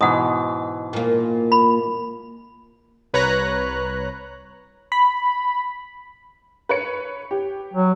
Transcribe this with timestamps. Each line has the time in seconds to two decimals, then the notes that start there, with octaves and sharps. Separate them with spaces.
0.01 G#2 B2 E3 F#5 D#6
0.93 A#2 A#3
1.52 B5
3.13 C2 B4 C#5 A#5 F#6
4.92 B5
6.69 B4 C#5 C#7
7.31 G4
7.74 F#3